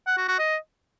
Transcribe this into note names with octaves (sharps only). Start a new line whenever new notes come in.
F#5
F#4
F#4
D#5